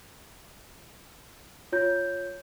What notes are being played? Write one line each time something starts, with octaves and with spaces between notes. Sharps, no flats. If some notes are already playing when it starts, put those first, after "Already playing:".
F4 C#5 G6